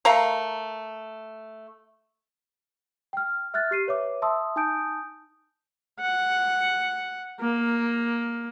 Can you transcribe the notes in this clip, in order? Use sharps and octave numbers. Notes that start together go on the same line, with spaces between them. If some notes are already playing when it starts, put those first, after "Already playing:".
A3 A#4 F5 A#5
G5 F6
E5 F6 F#6 A6
G4 C7 D#7
B4 C#5 E5 D6
E5 A5 C6 D#6 E6
D#4 G#5 A5 D#6 G6 D7
F#5
A#3